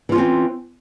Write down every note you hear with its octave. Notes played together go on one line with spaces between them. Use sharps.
E3 C4 C#4 F4